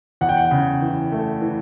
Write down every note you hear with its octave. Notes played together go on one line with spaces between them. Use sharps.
E2 F#5
G5
F#5
C#3
E3
A3
E3